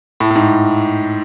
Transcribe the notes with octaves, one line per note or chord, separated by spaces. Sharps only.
A2
A2
G#2